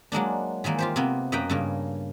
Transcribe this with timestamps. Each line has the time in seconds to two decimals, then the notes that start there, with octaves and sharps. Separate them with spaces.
0.12 F#3 G#3 A#3 D4
0.64 D#3 E3 G#3 A#3
0.79 F4 G4 C5
0.96 C3 A#3 B3
1.32 F#2 A#3 B4 D#5 G5 A#5
1.50 G2 C#3 A#3